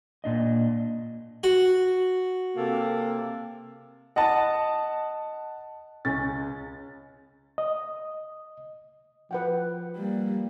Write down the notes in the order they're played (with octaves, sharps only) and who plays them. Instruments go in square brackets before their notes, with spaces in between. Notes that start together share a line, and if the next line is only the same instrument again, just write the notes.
[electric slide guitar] A#2 D4 D#5
[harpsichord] F#4
[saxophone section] C3 A#3 A4
[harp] D#5 [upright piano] F#5 A5
[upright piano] C#2 C#4 A6
[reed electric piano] D#5
[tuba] F3 [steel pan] B4 F#5 G5
[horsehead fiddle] G3 A#3